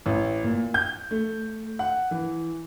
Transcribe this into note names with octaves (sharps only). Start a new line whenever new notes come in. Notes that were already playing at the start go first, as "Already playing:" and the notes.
A1
A#2
G6
A3
F#5
E3